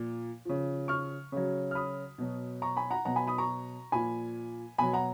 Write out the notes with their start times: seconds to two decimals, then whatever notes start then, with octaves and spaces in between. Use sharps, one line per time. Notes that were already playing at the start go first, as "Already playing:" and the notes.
Already playing: A#2 F3
0.45 C#3 F3
0.88 C#6 F6
1.32 C#3 F#3
1.71 F6
1.75 B5 D#6
2.18 B2 F#3
2.62 A#5 C#6
2.77 G#5 B5
2.90 F#5 A#5
3.05 B2 F#3 F#5 A#5
3.16 G#5 B5
3.27 B5 D#6
3.38 A#5 C#6
3.92 A#2 F3 G#5 B5
4.78 B2 F#3 G#5 B5
4.93 F#5 A#5